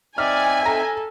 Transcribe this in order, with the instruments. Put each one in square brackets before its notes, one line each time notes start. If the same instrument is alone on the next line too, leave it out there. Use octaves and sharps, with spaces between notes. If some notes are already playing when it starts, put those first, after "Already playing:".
[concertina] C4 D#4 E5 [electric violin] D5 [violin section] G#5 [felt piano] F6
[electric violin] A4 [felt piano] A#5